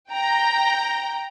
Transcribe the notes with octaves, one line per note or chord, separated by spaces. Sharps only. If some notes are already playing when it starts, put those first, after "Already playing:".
G5 A#5